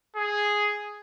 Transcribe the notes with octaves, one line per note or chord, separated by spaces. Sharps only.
G#4